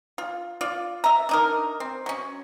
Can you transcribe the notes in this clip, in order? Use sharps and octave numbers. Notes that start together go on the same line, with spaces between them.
F4
F4 D5
E5 A#5
D4 D#4 A#4
C4
F#3 C#4